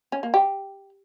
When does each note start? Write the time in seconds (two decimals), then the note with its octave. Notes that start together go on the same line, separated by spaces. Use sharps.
0.12 C#4
0.23 A#3
0.34 G4